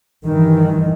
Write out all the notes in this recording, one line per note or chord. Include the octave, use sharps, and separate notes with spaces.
G2 D#3 E3